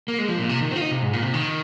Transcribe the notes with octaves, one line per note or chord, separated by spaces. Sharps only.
A#3
G#3
F3
A#2
C3
D#3
C4
F4
D#4
C3
G#2
A#2
C3
D#3